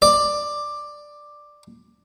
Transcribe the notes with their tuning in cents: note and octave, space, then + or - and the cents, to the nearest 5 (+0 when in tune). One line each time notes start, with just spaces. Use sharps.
D5 +10